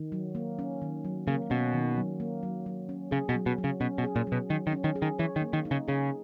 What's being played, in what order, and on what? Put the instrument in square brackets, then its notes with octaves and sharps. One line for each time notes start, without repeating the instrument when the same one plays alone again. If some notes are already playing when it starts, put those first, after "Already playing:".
Already playing: [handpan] D#3
F#3
A#3
C#4
D#3
F#3
[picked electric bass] C#3 [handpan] A#3
[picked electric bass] B2 [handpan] C#4
[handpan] D#3
F#3
A#3
F#3
F#3
C#4
[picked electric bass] C#3 [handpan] G#4
[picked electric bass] B2
[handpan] F#3
[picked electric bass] B2
[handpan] F#3
[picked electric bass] C#3
[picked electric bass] B2 [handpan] C#4
[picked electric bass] B2
[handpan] G#4
[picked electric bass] A#2
[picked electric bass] B2 [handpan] F#3
[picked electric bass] D#3 [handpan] F#3
[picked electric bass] D#3
[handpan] C#4
[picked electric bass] D#3
[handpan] G#4
[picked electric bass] D#3
[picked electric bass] E3 [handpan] C#5
[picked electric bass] D#3
[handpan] A#3
[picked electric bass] D#3
[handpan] D#4
[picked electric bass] C#3
[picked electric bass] C#3 [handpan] G#4